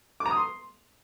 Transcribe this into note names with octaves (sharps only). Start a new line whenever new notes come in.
D6
A#5
D#6
C6